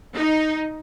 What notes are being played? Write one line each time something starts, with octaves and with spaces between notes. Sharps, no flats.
D#4